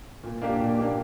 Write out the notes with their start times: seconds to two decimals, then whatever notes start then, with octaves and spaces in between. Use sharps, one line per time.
0.23 A#2
0.42 A#3 D4 G4
0.60 A#2
0.78 A#3 D4 G4